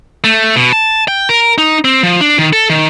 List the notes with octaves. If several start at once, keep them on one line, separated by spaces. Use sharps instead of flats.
A3
B2
A5
G5
A#4
D#4
C4
F3
D4
D#3
A4
D#3